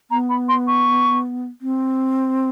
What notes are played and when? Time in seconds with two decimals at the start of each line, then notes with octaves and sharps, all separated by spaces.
0.11 B3 A#5
0.30 B5
0.49 C6
0.67 C#6
1.62 C4